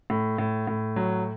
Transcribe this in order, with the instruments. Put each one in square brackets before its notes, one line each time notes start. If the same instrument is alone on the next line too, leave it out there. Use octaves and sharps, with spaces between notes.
[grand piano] A2
A2
A2
F#3